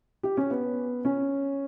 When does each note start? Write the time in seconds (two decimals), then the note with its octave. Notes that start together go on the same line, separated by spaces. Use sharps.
0.23 G4
0.37 C#4
0.51 B3
1.05 C#4